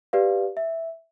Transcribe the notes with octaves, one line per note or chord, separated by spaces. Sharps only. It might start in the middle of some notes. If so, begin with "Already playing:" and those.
G4 B4 D5 F5
E5